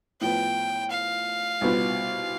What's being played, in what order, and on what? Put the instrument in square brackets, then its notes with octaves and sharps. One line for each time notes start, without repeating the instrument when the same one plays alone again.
[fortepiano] A2 F3 B3 [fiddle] G5
[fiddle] F5
[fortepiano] C2 B2 B3 F4